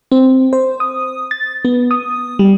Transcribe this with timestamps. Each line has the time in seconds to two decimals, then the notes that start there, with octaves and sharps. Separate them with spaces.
0.12 C4
0.53 C5
0.80 D#6
1.31 A6
1.65 B3
1.91 D#6
2.39 G3